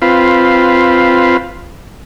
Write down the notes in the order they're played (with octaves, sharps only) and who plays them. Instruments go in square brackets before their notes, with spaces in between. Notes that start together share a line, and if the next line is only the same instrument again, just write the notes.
[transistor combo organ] C4 F4 B4